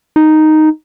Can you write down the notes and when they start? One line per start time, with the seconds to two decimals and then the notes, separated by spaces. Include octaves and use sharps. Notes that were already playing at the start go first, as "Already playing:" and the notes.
0.16 D#4